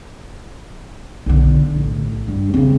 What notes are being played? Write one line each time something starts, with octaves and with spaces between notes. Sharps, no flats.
B1 D3
A1
G2
C#3 C4